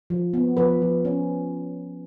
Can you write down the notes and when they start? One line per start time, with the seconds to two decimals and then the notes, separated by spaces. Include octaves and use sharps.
0.10 F3
0.34 B3
0.57 F3 B4
0.82 F3
1.05 C#4